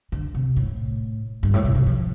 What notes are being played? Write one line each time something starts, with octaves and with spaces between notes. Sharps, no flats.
D3
C3
A2
G2
A2
C3
C3
F3